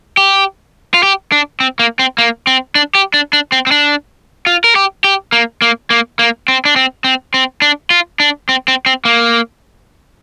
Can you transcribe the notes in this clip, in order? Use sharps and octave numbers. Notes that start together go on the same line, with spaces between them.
G4
F4
G4
D4
C4
A#3
C4
A#3
C4
D4
G4
D4
D4
C4
C4
D4
F4
A#4
G4
G4
A#3
A#3
A#3
A#3
C4
D4
C4
C4
C4
D4
F4
D4
C4
C4
C4
A#3